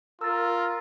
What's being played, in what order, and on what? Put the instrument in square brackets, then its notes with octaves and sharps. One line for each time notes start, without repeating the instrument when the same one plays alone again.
[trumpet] F4 [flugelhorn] A#4 [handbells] E6 A6